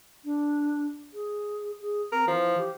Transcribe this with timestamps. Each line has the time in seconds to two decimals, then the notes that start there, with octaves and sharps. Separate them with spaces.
0.25 D4
1.14 G#4
1.81 G#4
2.12 C4 A#4
2.28 E3 F3
2.58 G4